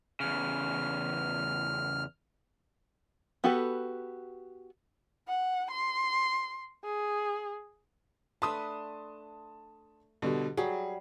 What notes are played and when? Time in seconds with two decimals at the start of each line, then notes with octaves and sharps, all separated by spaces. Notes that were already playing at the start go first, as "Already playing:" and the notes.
0.20 E2 C#3 F6
3.44 B3 F#4 G4 A4 B4
5.28 F#5
5.71 C6
6.84 G#4
8.42 A3 D4 B4 A5 C6 D#6
10.22 B2 D3 G3
10.57 F#3 G3 G#4